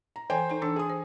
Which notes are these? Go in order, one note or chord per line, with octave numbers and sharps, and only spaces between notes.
A#5
E3 A4 C5 G5 G#5
D#4 A4 A#5
E3 D4 A4
G#4 D#6
C5